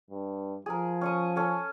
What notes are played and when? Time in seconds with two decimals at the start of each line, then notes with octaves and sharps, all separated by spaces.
0.10 G2
0.66 F3 G#4 A#4
1.01 C#4 C#6 D#6
1.36 C#4 A4